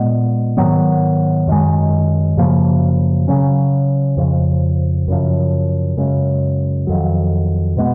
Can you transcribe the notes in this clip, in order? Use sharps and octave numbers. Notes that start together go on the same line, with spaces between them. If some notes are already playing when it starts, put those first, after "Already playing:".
Already playing: A#2 G#3 B3
G#2 D#3 F#3 B3
F#2 D#3 G#3
F#2 C#3 F3 A#3
C#3 F#3 C#4
F2 C#3 F3
F#2 C#3 F3
F#2 C#3 G#3
F2 D#3 F#3
B2 G#3 B3